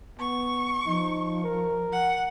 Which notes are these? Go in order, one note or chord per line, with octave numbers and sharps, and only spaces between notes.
B3 C#6
F3 D#4
A#4
F#5